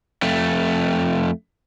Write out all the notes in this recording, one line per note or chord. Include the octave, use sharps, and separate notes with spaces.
F2 A3